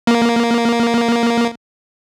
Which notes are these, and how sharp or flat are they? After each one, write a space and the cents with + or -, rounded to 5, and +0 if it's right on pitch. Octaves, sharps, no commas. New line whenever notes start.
A#3 +5